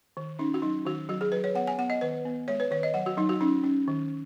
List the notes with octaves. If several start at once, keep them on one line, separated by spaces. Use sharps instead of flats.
D#3
C#4 D#4
F#4
F#3 D#4
D#3 F#4
F#3 F#4
G#4
F#3 B4
C#5
B3 F#5
G#5
B3 F#5
D#5
D#3 B4
B3
G#3 C#5
B4
D#3 C#5
D#5
F#3 F#5
F#4
F#3 D#4
F#4
C#4 D#4
C#4
D#3